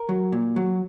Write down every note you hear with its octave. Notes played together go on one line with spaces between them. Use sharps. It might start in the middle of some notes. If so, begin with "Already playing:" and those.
Already playing: A#4
F#3
A#2
F#3